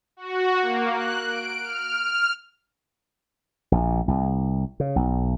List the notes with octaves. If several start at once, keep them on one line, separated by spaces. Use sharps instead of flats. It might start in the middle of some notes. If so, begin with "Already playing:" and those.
F#4
A#3
F#6
D7
F6
F6
A#1
C2
C#3
B1